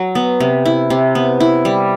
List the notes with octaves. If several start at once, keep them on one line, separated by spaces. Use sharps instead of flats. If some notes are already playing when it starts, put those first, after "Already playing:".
Already playing: F#3
B3
C3
E4
C3
B3
E4
G3